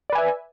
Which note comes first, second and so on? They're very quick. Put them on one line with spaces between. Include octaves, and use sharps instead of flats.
D5 B4 G#5 E5